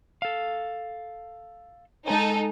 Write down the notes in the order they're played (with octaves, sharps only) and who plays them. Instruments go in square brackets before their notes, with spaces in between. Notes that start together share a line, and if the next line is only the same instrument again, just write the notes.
[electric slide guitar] A4 F5
[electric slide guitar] G#3 G#5 [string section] D#4 A4